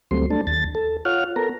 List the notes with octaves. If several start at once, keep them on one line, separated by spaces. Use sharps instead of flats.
D2 F#3 G3 A3 C4 C6
A3 D4 A5
D#2 A6
A4
F4 C#5 F#5 F6
B3 A4 A#4 A#5